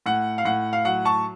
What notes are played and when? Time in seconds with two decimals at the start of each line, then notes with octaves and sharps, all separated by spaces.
0.06 A2 F#5
0.38 F5
0.45 A2 F#5
0.73 F5
0.85 F#3 F#5
1.05 A5 C#6